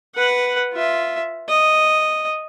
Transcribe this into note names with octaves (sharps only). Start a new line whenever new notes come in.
B4 F#5
F4 E5
D#5